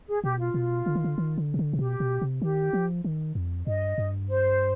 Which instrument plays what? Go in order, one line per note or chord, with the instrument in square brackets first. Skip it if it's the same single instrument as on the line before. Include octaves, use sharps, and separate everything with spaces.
[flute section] G#4
[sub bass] B2 [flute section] G4
[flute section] F4
[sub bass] B2
D3
D#3
D3
D#3
D3
C3
D3
C3
[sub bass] B2 [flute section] G4
[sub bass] B2
C3
[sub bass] D#3 [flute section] G4
[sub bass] F3
D#3
F2
[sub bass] G2 [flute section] D#5
[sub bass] G2
[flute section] C5